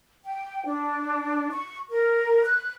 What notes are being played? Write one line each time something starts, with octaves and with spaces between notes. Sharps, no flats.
G5
D4
C#6
A#4
F#6